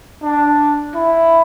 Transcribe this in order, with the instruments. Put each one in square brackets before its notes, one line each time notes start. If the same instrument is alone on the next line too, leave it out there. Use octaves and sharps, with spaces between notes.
[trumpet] D4
E4